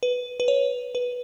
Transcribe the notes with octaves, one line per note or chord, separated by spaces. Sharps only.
B4
B4
C#5
B4